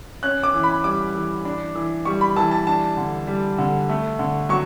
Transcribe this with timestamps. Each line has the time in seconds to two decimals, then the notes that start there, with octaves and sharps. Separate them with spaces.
0.23 C#4 F#6
0.43 D6
0.54 E3
0.63 B5
0.84 G3 D6
1.15 E3
1.45 D4
1.76 E3
2.05 G3 C#6
2.21 B5
2.36 E3 A5
2.51 A5
2.67 D4 A5
2.97 D3
3.27 G3
3.58 D3
3.89 A3
4.19 D3
4.49 F#3 C#6